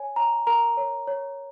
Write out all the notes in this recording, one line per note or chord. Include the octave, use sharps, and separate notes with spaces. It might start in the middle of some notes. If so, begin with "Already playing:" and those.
Already playing: C#5 G#5
C#5 A#5
A#4 A#5
C#5
C#5